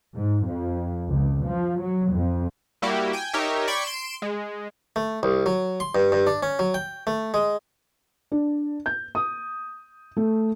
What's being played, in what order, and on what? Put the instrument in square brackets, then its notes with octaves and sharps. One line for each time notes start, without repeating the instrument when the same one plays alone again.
[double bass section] G#2
F2
C#2
F3
F#3
F2
[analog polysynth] G3 A#3 E4 F#4 G4
G5 G#5
D#4 G4 A#4 C#5 E5
D5 G5 B5 C#6 G#6
C6 D7 E7
G#3
[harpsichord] A3
C2
F#3
C6
G2
G2
D4
C#4
F#3
G5
A3
G#3
[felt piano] D4
G6
D#6
A3